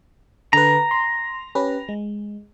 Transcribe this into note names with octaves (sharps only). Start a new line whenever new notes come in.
D3 A4 B4 A#5
C6
C#4 G4 B4
G#3